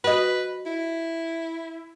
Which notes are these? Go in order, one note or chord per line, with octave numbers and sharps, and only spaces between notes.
F#4 B4 D#5
E4